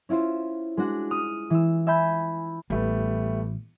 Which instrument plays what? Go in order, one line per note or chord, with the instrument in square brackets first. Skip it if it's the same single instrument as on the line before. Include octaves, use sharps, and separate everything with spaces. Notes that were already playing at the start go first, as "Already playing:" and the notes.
[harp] C#4 E4 F4 C5
G#3 D4 F#4
D#6 F6
E3 E6
E5 G#5 B5 G6
[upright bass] A1 [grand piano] G3 A3 B3